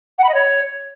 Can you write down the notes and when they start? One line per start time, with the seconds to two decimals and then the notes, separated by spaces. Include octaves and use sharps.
0.18 F#5
0.23 B5
0.29 D#5
0.34 C#5